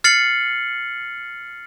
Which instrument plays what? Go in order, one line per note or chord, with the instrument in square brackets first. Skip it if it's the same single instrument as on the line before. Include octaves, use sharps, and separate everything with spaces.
[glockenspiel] F6 A6 C7 C#7 F#7